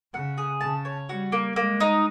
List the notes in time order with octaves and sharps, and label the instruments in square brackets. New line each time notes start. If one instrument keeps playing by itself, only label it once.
[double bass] C#3 [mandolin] F#5
[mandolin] G#4
[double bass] C#3 [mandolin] A5
[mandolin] C#5
[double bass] G3 [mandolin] F#4
[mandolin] A#3
[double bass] G#3 [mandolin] A#3
[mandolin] D#4